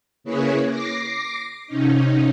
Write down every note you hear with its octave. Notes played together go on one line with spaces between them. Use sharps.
C#3 A#3 E4 G#4 B4 C#5
D6 A#6 C7
C3 C#4 D#4